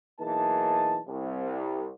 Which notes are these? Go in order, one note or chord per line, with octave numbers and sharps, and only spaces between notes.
B1 E3 A#3 D#4 G#4 A5
C2